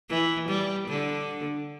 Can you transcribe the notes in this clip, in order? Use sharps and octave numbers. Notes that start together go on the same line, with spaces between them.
E3
G3
D3